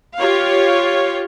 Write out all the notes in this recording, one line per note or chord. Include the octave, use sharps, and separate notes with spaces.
F4 G4 C#5 F5